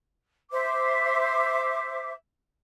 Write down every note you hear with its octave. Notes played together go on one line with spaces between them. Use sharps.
C5 E5 D6